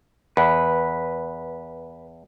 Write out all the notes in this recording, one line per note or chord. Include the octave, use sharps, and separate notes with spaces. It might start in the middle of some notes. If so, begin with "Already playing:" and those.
E2 B4